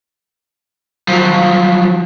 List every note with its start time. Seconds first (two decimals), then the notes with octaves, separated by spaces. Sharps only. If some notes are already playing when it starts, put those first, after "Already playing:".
1.08 F3 F#3